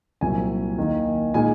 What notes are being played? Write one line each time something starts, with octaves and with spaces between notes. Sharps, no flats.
C2 A#2 F#3 C4 G#5
D#2 D#3 A#3 D#4
A#2 G#3 D#4 G#5